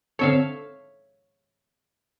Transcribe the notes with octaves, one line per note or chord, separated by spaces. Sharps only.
D3 C4 A4 C#5 E5 F5